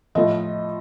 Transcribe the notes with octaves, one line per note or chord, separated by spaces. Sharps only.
A2 F3 D#5